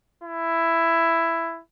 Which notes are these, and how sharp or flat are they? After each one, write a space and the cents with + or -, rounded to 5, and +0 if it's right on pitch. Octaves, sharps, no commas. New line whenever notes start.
E4 +10